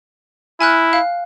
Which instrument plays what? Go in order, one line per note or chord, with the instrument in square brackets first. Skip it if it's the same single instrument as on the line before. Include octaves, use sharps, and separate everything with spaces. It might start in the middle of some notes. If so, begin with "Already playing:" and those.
[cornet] E4 [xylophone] G#5 F6 F#6
[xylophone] F5